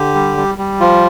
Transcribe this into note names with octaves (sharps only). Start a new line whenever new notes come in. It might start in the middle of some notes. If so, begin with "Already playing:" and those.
Already playing: D3 G4
G3
G3
G3
F3 F4